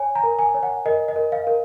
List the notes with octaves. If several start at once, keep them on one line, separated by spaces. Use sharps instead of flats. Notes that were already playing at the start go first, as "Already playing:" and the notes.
Already playing: C#5 G#5
A#5
A#4
G#5
C#5
F#5
A#4 D#5
D#5
A#4
F5
A#4